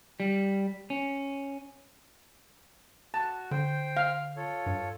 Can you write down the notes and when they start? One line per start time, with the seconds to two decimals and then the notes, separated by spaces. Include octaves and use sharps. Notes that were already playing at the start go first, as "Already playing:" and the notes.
0.20 G3
0.90 C#4
3.14 F#4 A5
3.51 D3 C5 G5
3.97 F5
4.37 F4 A4 C#5
4.66 G2